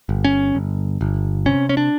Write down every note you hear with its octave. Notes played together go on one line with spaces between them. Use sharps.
G1
C#4
G1
G1
C3 C#4
C#4
D4